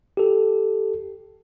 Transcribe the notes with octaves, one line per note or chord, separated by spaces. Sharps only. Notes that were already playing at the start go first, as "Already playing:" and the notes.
G4 A4